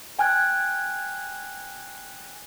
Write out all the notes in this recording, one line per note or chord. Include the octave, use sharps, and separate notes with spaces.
G5 G#5 F6 F#6 G#6